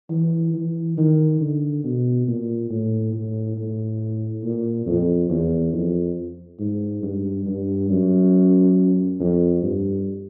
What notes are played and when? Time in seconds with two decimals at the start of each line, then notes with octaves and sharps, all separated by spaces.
0.10 E3
0.54 E3
0.98 D#3
1.41 D3
1.84 B2
2.27 A#2
2.70 A2
3.13 A2
3.57 A2
4.44 A#2
4.86 F2
5.30 E2
5.73 F2
6.60 G#2
7.03 G2
7.46 G2
7.90 F#2
9.20 F2
9.63 G2